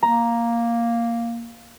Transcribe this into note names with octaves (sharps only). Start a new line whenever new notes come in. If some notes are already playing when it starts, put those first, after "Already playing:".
A#3 A#5